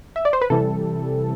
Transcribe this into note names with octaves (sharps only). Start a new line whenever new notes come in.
E5
D5
C5
B4
C3 E3 G3 A4